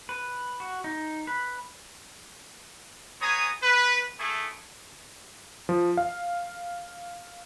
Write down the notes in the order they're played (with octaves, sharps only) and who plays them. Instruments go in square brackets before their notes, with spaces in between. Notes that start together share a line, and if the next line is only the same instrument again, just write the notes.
[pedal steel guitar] B4
F#4
D#4
B4
[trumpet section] B3 G#4 C#5 G#5 A#5 D#6
B4
A3 E4 G#4
[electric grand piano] F3
F5